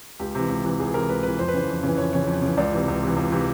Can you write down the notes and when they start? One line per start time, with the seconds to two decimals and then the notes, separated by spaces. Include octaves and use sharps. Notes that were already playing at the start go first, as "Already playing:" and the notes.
0.19 C#2 G4
0.35 C3 E3
0.49 C#2
0.64 C3 E3
0.79 C#2 G#4
0.94 C3 E3 A#4
1.09 C#2 B4
1.23 C3 E3 B4
1.38 F2 C5
1.48 B4
1.53 C#3 E3 C5
1.68 F2
1.83 C#3 E3
1.98 F2 C#5
2.13 C#3 E3 C#5
2.27 F2
2.42 C#3 E3
2.57 C#2 D5
2.72 C3 E3
2.88 C#2
3.03 C3 E3
3.16 C#2
3.32 C3 E3